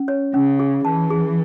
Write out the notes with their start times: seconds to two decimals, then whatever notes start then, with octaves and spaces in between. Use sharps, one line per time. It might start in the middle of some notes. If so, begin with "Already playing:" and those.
Already playing: C#4
0.08 C#5
0.34 C#3 C#4
0.59 G#4
0.85 E3 A5
1.10 G#4